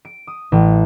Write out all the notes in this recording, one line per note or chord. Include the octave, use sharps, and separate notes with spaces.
D7
D#6
A1